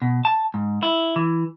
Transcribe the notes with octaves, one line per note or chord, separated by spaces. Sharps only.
B2
A5
G#2
E4
E3